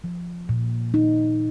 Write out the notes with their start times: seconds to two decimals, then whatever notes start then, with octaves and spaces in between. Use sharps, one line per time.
0.04 F3
0.49 A#2
0.94 D#4